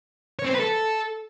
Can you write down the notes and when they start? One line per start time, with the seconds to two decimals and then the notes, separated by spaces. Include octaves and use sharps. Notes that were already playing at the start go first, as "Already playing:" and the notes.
0.39 C#5
0.44 C4
0.49 C5
0.55 B4
0.60 A4